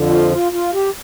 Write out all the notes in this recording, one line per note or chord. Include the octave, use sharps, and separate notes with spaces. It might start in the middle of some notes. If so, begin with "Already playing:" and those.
Already playing: F2 D3 F3
F4
F4
F4
G4